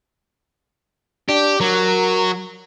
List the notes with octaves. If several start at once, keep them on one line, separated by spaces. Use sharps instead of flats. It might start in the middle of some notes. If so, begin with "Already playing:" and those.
D4 G4
F#3 A#4